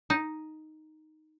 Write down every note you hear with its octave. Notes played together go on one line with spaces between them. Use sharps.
D#4